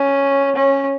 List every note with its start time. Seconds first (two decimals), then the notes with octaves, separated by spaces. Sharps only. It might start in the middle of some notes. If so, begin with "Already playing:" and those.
Already playing: C#4
0.56 C#4